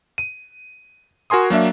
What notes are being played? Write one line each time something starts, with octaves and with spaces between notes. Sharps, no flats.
D#7
F#4 A#4 G#5 C6 D#6
F#3 A#3 D4 E5